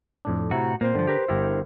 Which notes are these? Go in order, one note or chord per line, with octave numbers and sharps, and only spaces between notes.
F2 A2 D4
A2 C3 E4 F#4 A#5
A#2 A#3 C4 C5
G2 D3 F3
G4 A#4 B4
G1 D3 E4 G4 A#4 E5